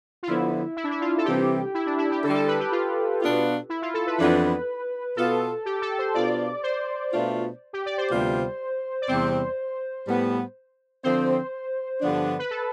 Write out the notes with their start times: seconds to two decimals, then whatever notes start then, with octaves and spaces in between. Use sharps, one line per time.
0.23 F4
0.27 D3 F3 B3 E4
0.77 E4
0.84 D4
0.91 E4
1.01 F4
1.18 A4
1.25 C3 E3 G3 C4 G4
1.74 E4
1.86 D4
1.98 E4
2.11 G4
2.23 D3 G3 D4 A4
2.35 A4
2.47 B4
2.60 G4
2.72 F4
3.21 B2 B3 D4 F4
3.69 E4
3.82 F4
3.94 A4
4.07 B4
4.18 F2 E3 B3 D4 B4
5.16 B2 B3 F4 A4
5.65 G4
5.82 A4
5.98 C5
6.14 B2 B3 D4 F4 D5
6.63 C5
7.12 B2 A3 D4 F4
7.73 G4
7.86 D5
7.98 C5
8.10 D2 C3 G3 B3 F4
9.02 D5
9.08 E2 C3 G3 C4 C5
10.06 A2 G3 B3
11.03 D3 F3 C4 C5
12.01 G2 D3 F3 B3 D4
12.39 B4
12.50 A4